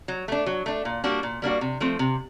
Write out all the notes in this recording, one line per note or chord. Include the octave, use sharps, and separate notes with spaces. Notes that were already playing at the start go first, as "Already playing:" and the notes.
F#3
A3 D4
F#3
A3 D4
A#2
G3 A#3 D4 F#4
A#2
G3 A#3 D4 F#4
C3
F3 A3 C4
C3